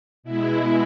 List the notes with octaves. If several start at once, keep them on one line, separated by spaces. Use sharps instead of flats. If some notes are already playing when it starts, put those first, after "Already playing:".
B2 G#3 E4